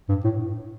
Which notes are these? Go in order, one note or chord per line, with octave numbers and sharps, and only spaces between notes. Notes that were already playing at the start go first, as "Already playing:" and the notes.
G2
A2